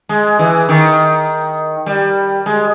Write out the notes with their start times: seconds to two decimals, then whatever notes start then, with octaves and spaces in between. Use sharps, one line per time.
0.09 G#3
0.39 E3
0.69 D#3
1.86 G3
2.46 G#3